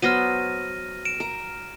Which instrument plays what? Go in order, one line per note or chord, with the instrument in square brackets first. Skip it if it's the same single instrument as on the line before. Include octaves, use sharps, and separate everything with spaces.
[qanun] F#3 B3 C5 [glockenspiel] F6 A#6 D#7
[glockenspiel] D7 E7
[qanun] A#4